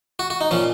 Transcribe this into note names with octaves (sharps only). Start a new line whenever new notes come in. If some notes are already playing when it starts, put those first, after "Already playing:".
F#4
F#4
D#4
A#2 F3 C#4